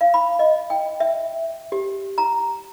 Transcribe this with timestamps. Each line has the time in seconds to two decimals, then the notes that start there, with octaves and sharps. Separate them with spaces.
0.01 F5
0.14 B5
0.39 D#5
0.70 G5
1.00 E5
1.72 G4
2.18 A#5